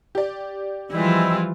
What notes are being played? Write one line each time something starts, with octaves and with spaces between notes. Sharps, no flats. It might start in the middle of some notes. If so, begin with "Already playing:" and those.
G4 D5
E3 F3 G3 G#3 C4 E4 F4